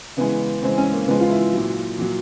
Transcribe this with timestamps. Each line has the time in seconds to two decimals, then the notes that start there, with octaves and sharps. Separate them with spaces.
0.17 C#3 E3 G#3 B3
0.62 C#3 E3 G#3 C4
0.78 C#4
0.93 A#3
1.07 C#3 F3 G#3 B3
1.21 F4
1.30 E4
1.53 A#2 F#3
1.98 A#2 F#3